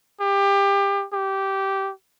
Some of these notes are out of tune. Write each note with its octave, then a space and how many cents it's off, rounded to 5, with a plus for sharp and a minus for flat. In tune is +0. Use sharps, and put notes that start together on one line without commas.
G4 +25
G4 -15